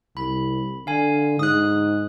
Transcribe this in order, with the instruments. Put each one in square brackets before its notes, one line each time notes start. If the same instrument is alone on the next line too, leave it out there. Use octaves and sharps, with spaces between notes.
[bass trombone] C2 [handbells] B5
[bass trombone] D3 [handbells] F5 G#5
[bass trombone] G#2 [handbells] D#6 F#6